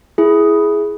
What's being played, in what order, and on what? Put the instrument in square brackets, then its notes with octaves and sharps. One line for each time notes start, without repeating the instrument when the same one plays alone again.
[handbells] E4 G#4